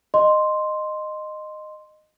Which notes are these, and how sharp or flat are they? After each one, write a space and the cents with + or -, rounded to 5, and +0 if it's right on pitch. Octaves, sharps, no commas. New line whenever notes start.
D#5 -15 C6 +0